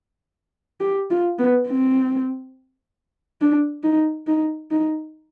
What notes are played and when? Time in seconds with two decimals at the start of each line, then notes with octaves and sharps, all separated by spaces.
0.80 G4
1.10 F4
1.38 B3
1.67 C4
3.41 D4
3.83 D#4
4.27 D#4
4.71 D#4